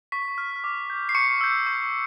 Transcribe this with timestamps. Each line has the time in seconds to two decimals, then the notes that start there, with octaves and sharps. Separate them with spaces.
0.12 C#6 B6
0.38 F6
0.64 D6
0.90 G6
1.09 C7
1.15 C#6 C#7
1.41 E6 G6
1.66 C#6